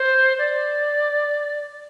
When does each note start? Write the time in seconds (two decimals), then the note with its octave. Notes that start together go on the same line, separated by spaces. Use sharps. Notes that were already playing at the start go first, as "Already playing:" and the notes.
Already playing: C5
0.39 D5